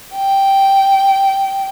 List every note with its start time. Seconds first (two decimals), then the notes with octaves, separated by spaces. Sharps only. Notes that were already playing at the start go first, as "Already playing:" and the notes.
0.15 G5